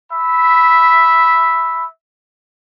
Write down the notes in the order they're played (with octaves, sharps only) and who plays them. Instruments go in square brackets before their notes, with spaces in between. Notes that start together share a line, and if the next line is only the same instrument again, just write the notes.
[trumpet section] E5 B5